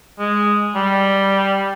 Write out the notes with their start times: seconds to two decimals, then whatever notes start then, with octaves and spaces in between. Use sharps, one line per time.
0.19 G#3
0.75 G3